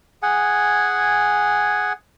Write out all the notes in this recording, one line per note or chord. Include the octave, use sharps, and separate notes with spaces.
G#4 F#5 G#5